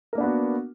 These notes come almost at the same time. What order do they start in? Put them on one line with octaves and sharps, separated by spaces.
A#4 A#3 D4 B3 F#4